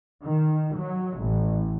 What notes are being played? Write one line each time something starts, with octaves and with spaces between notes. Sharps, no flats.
D#3
F#3
A1